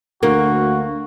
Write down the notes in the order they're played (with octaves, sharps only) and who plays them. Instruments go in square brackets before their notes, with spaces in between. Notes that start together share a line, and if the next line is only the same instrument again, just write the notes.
[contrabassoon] D2 [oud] A#3 [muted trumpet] F#4